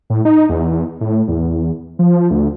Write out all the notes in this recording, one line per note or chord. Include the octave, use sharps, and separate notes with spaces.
A2
D#4
E2
A2
E2
F3
D2